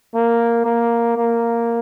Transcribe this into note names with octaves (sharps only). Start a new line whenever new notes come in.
A#3
A#3
A#3